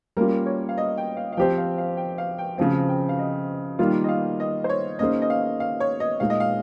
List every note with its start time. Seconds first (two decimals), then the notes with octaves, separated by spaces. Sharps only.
0.17 G3 A#3 C#4 F4 A#4
0.46 C#5
0.69 F5
0.78 D#5
0.97 G5
1.17 F5
1.32 F5
1.37 F3 C4 G4 C5 G5
1.58 F5
1.78 F5
1.97 G5
2.18 F5
2.38 G5
2.58 C#3 F3 C4 F5
2.89 G5
3.09 F5
3.19 D#5
3.79 D#3 G3 A#3 F4 F5
4.04 D#5
4.08 F5
4.40 D#5
4.64 C5
4.69 C#5
4.99 D#3 A#3 C#4 G#4 C5 D#5
5.22 D#5
5.30 F5
5.60 F5
5.80 C#5
6.00 D#5
6.20 A#2 G#3 D#4 G#4 F5
6.30 D#5
6.40 F5